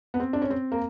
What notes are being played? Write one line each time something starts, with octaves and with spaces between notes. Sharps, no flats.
B3
C4
D4
C#4
C4
A#3